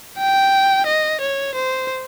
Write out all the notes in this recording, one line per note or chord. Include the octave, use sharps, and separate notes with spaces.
G5
D#5
C#5
C5